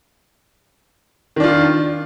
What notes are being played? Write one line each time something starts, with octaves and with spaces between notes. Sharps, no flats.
D#3 D4 F4